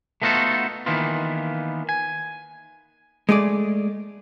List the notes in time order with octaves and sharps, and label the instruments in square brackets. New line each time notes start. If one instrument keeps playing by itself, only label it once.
[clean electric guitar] A3 B3 D#4 F4 F#4 A4
D#3 E3 A#3 B3 F4
G#5
[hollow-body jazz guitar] G#3 A3 G#4 D5